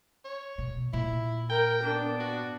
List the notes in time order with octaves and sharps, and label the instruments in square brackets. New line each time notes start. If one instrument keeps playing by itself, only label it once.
[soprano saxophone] C#5
[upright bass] B2
[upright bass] A#2 [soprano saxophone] E4
[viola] A#4 [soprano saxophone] G5
[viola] B3 D4
[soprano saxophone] F#4